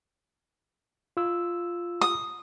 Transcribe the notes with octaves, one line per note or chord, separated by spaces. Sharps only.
F4 E6
D#6